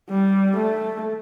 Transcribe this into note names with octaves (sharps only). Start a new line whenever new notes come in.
G3
A3